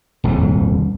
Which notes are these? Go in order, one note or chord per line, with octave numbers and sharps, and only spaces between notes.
D#1 C2 F2 G#2